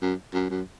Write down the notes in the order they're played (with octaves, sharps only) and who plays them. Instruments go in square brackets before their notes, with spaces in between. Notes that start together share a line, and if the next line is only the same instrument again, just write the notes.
[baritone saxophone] F#2
F#2
F#2